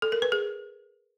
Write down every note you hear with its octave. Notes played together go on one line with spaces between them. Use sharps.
A4
A#4
B4
G#4